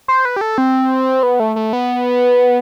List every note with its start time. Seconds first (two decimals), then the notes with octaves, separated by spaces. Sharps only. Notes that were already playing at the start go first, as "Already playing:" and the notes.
0.08 C5
0.25 B4
0.36 G4
0.41 A4
0.58 C4
1.23 B3
1.40 A3
1.56 A3
1.73 B3